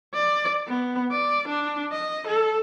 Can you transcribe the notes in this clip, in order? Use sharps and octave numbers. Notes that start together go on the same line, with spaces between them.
D5
B3
D5
D4
D#5
A4